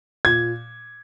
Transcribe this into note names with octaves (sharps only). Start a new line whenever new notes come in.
A#2 G#6